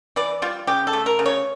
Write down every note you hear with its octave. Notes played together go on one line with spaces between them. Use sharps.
E3 D5
G3 F4
C#3 G4
A4
A3
A#4
C#3
C#5